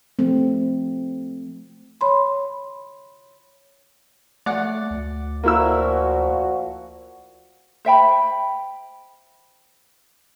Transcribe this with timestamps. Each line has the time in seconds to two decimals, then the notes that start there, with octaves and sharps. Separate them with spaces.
0.19 F3 A3 C4
2.01 C#5 B5 C6
4.46 A3 D5 F#5
4.91 D2
5.44 A#2 F3 A#3 E4 F#4 E6
7.85 C5 E5 G5 B5